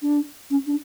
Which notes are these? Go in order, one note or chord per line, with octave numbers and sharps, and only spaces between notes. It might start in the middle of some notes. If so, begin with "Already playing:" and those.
D4
C#4
D4